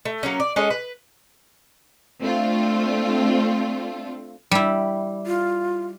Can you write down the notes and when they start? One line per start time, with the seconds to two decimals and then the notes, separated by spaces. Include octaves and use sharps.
0.05 A3
0.23 F#3 A#3 C#4
0.40 D5
0.56 G#3 C#4 A4 D#5
0.70 B4
2.21 A3 C4 D4 F4
4.51 G3 E4
5.26 F4